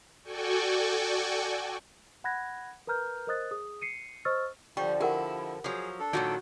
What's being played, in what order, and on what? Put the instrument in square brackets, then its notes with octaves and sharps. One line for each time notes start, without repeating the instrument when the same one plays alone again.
[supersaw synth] F#4 A4 D5 G5 G#5 C#6
[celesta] F#5 B5 F#6 G#6 A#6
A#4 B4 A#5 F6 G6
A#4 C5 D#5 D#6 F#6 A6
G#4 D#6
C7 C#7 D#7
C5 D#5 C#6 E6 F6 A6
[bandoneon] D3 F3 [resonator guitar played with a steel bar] G3 [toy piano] G5 C#6
[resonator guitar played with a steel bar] E4 [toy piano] G4 A#4 F#5
[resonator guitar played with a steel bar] F3 F#3 [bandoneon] G#4
[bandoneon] D4 A4
[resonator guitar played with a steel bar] A#2 D#3 F#3 [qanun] F#4 G5